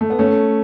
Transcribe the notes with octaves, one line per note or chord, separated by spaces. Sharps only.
A3
B3
A3 C#4